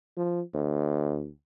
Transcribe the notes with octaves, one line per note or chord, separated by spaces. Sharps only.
F3
D2